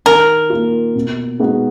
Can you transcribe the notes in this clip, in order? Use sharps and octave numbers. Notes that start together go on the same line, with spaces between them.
D#3 A#4
A#3 F4
B2
G#3 B3 D#4 F#4